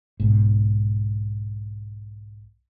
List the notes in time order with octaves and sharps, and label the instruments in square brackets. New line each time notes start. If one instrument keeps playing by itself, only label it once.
[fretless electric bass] B1 G#2